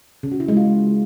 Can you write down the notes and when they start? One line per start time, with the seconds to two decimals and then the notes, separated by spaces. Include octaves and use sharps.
0.23 C#3
0.32 F#4
0.40 E4
0.48 G#3
0.57 F4